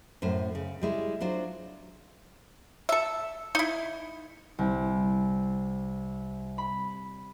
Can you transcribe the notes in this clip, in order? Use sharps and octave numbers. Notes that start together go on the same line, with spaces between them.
F#2 A2 C5
C#3
G3 G#3 E4
F#3 D4 F4 C5
A4 E5
D#4 E4
C2
B5